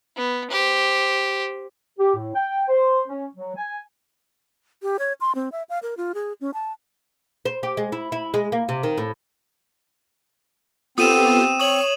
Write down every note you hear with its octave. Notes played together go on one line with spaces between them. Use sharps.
B3
G4 C5
G4
A2
G5
C5
C#4
F#3
G#5
G4
C#5
C6
C4
E5
F5
A#4
F4
G#4
C#4
A5
C5
G4
G#3
E4
E4
G#3
A#3
C3
D#3
A2
B3 C4 F4 G4 A4 D#6 D#7 E7
C#5 C#6 D#6 F#7